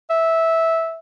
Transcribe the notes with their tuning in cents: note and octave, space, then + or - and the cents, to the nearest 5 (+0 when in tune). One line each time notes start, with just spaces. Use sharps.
E5 -10